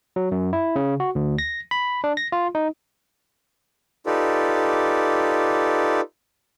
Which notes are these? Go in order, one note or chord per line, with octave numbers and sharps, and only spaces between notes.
F#3
F#2
E4
C#3
F#4
D2
A#6
B5
D4
A#6
F4
D#4
D#4 F4 G4 A4 B4 D5